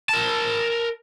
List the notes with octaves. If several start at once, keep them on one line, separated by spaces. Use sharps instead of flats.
A#4 A5